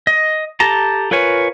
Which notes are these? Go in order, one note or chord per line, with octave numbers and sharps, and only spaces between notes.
D#5
G4 A4 A5 A#5
F4 A#4 B4 C#5 G#5